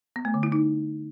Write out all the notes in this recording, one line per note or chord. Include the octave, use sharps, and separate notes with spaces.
B3
A3
D3
E4
D#4